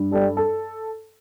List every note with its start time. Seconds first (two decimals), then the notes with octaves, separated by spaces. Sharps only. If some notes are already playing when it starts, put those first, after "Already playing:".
Already playing: G2
0.12 G3 A4
0.37 A4